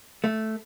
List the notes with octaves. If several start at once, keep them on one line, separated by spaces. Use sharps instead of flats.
A3